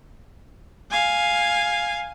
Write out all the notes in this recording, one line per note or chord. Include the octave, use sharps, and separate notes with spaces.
F5 G#5